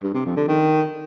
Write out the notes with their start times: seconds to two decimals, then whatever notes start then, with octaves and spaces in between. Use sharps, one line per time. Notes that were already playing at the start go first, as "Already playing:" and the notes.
0.03 G2
0.14 C3
0.25 F2
0.37 D3
0.48 D#3